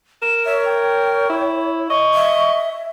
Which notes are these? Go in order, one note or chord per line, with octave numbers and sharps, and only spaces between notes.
A#4 E7
C#5 E5
G5
E4
D#5 C#6
E5